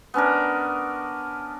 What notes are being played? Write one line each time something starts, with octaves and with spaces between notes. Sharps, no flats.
B3 C#4 D4 A#4